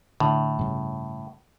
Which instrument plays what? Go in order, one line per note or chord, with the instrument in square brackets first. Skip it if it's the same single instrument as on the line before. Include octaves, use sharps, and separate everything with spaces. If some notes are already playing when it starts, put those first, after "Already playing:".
[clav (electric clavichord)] A2 [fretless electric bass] D3
[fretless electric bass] G2 C#3